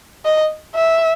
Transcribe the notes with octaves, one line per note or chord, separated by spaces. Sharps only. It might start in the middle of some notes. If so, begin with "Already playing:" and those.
D#5
E5